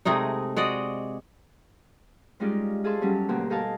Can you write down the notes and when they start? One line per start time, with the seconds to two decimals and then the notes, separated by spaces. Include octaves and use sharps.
0.05 C3 G#3 A3 D#4
0.56 G#3 F#4 D5 D#5
2.40 G3 G#3 C#4 D#4 F4 D5
2.84 F4 G#4 A4 E5 A5 C6
3.01 F#3 G3 B3 C#4
3.29 D2 B2 A#3 F#4 G4 C6
3.50 G4 A4 D#5 F5 G#5 A5